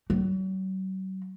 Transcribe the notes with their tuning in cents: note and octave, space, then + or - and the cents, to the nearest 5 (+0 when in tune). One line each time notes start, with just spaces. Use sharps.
F#3 +40